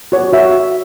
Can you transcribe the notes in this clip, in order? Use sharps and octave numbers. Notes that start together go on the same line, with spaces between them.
F#4 C#5
F#4 E5